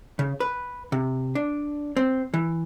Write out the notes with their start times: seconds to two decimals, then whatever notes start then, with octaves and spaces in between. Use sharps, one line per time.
0.19 C#3
0.40 B4
0.92 C3
1.35 D4
1.97 C4
2.34 E3